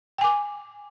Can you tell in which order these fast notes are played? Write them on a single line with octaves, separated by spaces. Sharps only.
G5 G#5 D6